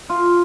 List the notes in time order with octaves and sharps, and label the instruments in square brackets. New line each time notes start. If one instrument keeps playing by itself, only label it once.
[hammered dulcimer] F4